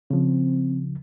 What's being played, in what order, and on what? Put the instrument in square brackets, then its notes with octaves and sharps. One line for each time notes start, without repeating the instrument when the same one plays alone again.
[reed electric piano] C#3 F3 [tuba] C4